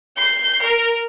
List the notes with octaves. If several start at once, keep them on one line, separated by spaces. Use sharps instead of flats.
G6 C7
A#4